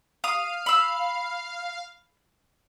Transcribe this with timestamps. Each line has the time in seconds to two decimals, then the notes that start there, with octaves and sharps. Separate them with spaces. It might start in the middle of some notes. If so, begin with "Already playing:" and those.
0.24 F5 D#6
0.66 B5 E6